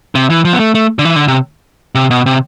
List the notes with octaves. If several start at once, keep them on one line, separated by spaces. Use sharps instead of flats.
C3
E3
F3
B3
A3
A3
D3
E3
D3
C3
C3
B2
C3